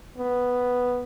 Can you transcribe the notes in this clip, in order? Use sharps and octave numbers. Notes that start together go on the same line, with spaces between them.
B3